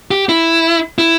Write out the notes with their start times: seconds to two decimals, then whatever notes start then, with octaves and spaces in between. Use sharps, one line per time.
0.11 G4
0.29 E4
0.99 E4